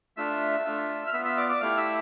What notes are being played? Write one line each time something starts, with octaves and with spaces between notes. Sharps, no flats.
A3 D4 F4 E5 E6
A3 D4 F4
F6
B3 F4 E5 E6
E5 E6
D5 D6
D5 D6
A3 E4 G4 F5 F6
E5 E6